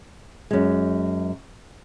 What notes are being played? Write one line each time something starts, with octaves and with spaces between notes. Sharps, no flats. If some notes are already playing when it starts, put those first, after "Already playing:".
F#2 G#3